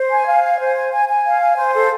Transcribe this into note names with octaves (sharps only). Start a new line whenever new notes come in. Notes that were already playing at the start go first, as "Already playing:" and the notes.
Already playing: C5
G#5
F5
G#5
C5
G#5
G#5
G#5
F5
G#5
C5
A4